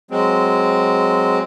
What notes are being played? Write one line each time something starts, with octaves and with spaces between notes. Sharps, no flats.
F#3 G#3 C4